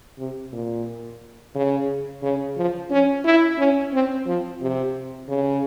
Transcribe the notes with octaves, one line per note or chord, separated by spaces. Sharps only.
C3
A#2
C#3
C#3
F3
C#4
E4
C#4
C4
F3
C3
C#3